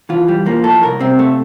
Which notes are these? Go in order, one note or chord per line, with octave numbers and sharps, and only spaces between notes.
E3 F4
G3
F3 A#3
A2 A4
C2 A#4
C3 C4
A3